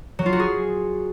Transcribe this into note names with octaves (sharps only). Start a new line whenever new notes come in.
F#3
F4
F#4
G#4